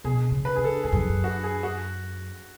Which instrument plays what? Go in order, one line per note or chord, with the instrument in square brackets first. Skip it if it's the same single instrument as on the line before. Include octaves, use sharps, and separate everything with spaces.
[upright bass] B2 [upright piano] G#4
[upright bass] C#3
[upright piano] B4
[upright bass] C#3 [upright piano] G#4
[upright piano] A4
[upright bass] G#2 [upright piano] G#4
[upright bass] F#2
F2
F#2
[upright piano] F#4
G#4
F#4